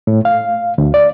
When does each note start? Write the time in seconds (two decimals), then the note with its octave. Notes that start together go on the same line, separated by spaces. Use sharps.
0.07 A2
0.25 F5
0.78 D2
0.94 D5